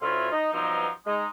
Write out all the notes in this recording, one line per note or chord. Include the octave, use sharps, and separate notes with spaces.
D2 C#4 E4 F4
D#4
G2 B2 F3 F#3 C4 D#4
G#3 D#4